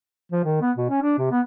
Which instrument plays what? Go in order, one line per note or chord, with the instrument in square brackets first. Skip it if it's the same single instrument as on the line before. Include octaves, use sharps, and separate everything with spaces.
[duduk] F3
D#3
B3
B2
C#4
D4
C3
B3